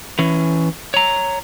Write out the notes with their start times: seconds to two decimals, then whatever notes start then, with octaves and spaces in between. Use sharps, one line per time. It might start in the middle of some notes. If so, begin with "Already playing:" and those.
0.19 E3 C#4
0.94 C#5 A#5